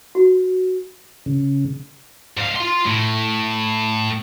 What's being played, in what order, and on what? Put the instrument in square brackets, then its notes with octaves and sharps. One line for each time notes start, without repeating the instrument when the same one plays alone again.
[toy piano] F#4
[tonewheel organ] C#3
[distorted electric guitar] G#2 F5
F4 C6
A2